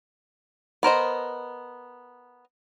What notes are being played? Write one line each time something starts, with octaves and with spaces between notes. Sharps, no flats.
B3 A#4 C5 D#5